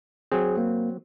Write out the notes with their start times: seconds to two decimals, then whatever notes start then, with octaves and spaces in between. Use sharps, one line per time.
0.32 F#3 C4 G#4
0.58 A#3